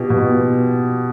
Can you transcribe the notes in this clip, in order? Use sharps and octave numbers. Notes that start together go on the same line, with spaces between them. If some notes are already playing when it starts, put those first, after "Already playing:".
Already playing: B2 F4 G4
B2